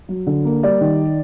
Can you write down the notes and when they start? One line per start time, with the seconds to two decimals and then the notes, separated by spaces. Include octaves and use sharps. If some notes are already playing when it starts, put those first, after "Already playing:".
0.09 F#3
0.27 D3
0.45 A#3
0.63 G3 D5
0.81 D#3